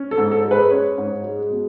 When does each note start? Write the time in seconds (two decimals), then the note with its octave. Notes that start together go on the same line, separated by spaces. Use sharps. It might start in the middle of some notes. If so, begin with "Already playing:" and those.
Already playing: C#4
0.11 A4
0.18 G#2
0.32 A4
0.45 G#3
0.51 B4
0.71 C#4 C#5
0.98 G#2
1.24 G#3
1.51 B2